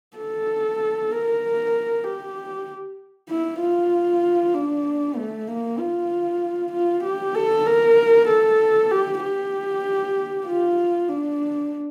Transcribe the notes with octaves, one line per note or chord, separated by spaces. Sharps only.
A4
A#4
G4
E4
F4
D4
A3
A#3
F4
F4
G4
A4
A#4
A4
G4
G4
F4
D4